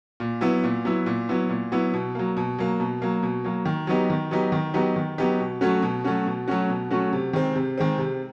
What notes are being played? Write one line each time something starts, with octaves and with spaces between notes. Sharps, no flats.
A#2
F#3 B3 E4
A#2
F#3 B3 E4
A#2
F#3 B3 E4
A#2
F#3 B3 E4
B2
F#3 A#3
B2
F#3 A#3
B2
F#3 A#3
B2
F#3 A#3
D#3
F#3 B3 D#4 G4
D#3
F#3 B3 D#4 G4
D#3
F#3 B3 D#4 G4
D#3
F#3 B3 D#4 G4
B2
F#3 A3 C#4 F#4
B2
F#3 A3 C#4 F#4
B2
F#3 A3 C#4 F#4
B2
F#3 A3 C#4 F#4
C3
D#3 G#3 C4
C3
D#3 G#3 C4
C3